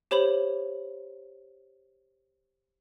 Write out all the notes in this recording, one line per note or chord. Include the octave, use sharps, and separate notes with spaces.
G4 C5 C#5 B5 F7 F#7